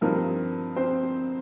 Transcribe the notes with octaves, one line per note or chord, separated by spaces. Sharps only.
G2 F3 C4 D#4 A#4
C4 C5